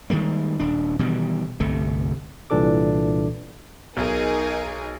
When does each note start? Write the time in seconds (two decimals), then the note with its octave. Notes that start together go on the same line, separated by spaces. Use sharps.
0.10 D#3 G3 G#3 A#3
0.60 D#1 D4
0.99 B2 D#3 E3 G3
1.60 G1 C2 C3 A3
2.50 C2 A#2 E3 D4 A4 D6
3.97 B1 D#4 G#4 A#4